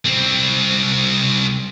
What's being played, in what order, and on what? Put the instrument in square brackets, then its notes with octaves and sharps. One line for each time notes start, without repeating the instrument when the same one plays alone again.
[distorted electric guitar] C2 C4